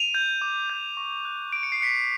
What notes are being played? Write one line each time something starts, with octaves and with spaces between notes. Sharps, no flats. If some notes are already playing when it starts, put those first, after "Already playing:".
Already playing: D#7 F7
G6
D6
G6
C#6
F#6
C#6 D7
C#7
C7
F#6 B6 C#7